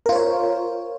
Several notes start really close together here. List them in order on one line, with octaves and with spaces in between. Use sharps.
A#4 F4 C5 C#5